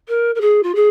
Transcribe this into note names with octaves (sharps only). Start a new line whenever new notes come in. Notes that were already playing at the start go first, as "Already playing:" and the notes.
A#4
A#4
G#4
F4
G#4